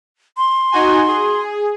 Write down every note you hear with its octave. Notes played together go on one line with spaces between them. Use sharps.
C6
D#4 F#4 G#5
G#4